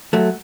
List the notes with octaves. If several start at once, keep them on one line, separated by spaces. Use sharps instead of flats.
F#3 A3